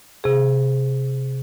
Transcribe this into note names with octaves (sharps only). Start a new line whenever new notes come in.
C3 G#4